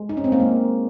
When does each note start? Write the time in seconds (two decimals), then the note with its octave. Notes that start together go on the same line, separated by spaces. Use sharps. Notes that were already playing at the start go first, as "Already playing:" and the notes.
Already playing: G#3
0.09 D#4
0.17 C#4
0.24 C4
0.32 A#3
0.40 G#3